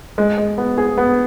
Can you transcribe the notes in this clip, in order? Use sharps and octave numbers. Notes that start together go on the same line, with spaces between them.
G#3
G#3
B3
G#4
B3